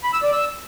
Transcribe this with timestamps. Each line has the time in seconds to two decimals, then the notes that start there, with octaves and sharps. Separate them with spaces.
0.04 B5
0.13 E6
0.23 D5
0.32 E6